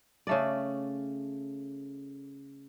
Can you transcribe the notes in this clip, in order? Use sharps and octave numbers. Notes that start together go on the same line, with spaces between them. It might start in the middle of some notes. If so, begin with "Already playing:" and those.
C#3 A3 D5